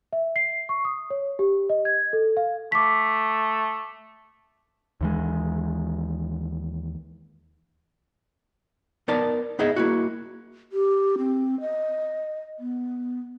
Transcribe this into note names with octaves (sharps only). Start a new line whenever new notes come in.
E5
C7
C#6
D#6
C#5
G4
D#5
G#6
A4
F5
A3 D6 B6
D#2 E3 G#3
B3 D#4 A#4 D5 A5
B3 D#4 G#4 D#5 E5
A#3 E4 F#4
G4
C4
D#5
B3